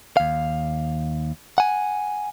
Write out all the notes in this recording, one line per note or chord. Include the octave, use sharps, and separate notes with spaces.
D#2 F5
F#5 G#5